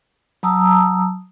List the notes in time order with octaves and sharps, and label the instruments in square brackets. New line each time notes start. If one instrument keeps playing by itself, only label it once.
[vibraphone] F#3 A5 A#5 D#6 E6